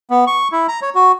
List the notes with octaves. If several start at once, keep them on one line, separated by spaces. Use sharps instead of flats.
B3
C#6
E4
A#5
C#5
F#4